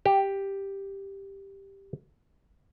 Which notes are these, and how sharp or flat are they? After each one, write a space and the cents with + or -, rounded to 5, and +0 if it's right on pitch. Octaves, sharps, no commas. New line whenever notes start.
G4 +0